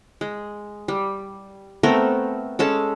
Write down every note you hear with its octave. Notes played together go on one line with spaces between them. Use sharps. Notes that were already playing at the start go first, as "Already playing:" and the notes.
G#3
G3
A3 B3 C4 A#4
G#3 C#4 A4 A5